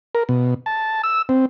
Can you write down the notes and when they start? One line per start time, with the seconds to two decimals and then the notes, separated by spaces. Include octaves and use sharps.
0.15 A#4
0.29 B2
0.66 A5
1.04 E6
1.29 C4